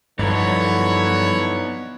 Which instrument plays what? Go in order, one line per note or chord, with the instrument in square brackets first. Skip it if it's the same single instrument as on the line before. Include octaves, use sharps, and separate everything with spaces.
[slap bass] G2 F3 [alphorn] D3 [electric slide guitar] B3 D#4 [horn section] E4 C#5